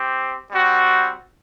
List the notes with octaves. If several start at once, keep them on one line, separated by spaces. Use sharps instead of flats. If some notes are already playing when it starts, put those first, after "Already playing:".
Already playing: C4 G4
G3 C4 F#4